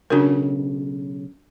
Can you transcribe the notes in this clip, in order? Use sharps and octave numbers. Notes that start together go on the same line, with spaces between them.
B1 C#3 D4 F#4 A#4